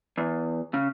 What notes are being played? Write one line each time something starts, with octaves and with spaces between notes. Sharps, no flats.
E2
C#3